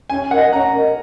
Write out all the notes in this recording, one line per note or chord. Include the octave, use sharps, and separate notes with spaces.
C#4 G#5
A#4 D#5 F#5
C#4 F#5 A#5
A#4 D#5